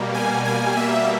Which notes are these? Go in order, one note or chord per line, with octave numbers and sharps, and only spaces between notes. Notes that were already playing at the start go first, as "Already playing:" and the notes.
Already playing: B2 G3 A#3
G#5
G#5
E5